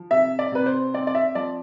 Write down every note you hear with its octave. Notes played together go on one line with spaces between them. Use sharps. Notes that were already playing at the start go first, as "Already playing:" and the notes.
Already playing: F3
C3 E5
D5
C3 B4
C5
C4 D5
D5
E5
F3 D5